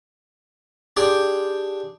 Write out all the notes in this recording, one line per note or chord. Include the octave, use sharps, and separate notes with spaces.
D4 G4 G#4 G5 C6